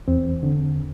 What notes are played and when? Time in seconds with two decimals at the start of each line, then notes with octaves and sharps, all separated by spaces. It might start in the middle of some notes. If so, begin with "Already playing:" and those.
0.08 E2 C4
0.43 D3